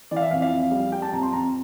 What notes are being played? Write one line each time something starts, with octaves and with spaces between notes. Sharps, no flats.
E3 D5
F5
E5
F2 F5
F5
F2
G3
G3 G5
A5
F2 A#5
C6
F2 A#5